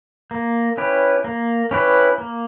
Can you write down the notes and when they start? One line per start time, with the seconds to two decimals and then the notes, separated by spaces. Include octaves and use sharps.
0.31 A#3
0.78 C#4 E4 G4 B4
1.24 A#3
1.71 C#4 E4 G4 B4
2.18 A#3